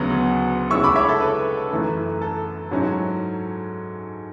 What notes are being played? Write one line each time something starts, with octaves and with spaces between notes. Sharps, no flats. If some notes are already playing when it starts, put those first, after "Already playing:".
Already playing: D2 C#3 F#3 B3
C#3 G#3 C#4 E4 C#6 E6
B5 D6
C#5 E5
A4
B4
F#2 E3 A3 E4
A4
G#2 F#3 C#4 E4